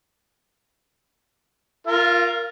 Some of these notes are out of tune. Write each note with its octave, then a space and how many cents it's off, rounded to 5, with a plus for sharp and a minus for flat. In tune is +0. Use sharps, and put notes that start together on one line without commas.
F4 +0 A#4 +0 F5 -35